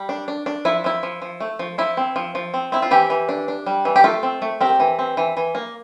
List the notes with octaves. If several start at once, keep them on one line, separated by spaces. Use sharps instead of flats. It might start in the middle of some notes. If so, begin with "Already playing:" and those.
Already playing: G3
D4
D4
D4
F3 E4
F3 E4
F3
F3
A3
F3
F3 E4
C4
F3
F3
C4
C4 E4
F4
E3 E4 G4
E3
D4
D4
G3
E3
G4
A3 F4 A4
C4
A3
C4 G4 A#4
E3
C4
E3
E3
A#3